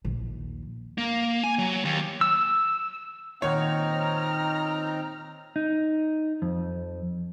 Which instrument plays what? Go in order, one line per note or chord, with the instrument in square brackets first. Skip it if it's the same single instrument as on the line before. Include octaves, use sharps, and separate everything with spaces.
[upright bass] A#1 D#2
[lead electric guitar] A#3
G#5
F#3
D#2
[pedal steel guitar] E6
[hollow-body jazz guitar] A#2 D#3 F#5 [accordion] C4 D#4 [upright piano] C#5 [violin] A#5 F6
[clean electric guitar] D#4
F2